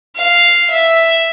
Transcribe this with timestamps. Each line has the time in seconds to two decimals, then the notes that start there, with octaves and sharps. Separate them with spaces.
0.16 F5
0.70 E5